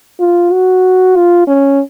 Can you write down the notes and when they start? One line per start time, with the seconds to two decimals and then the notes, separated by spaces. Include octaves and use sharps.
0.20 F4
0.52 F#4
1.16 F4
1.47 C#4